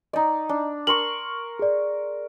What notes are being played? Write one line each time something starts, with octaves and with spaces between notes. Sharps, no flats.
D#4 D5 D#5 A#5
D4
A#4 C6 C#6 F#7
G#4 D5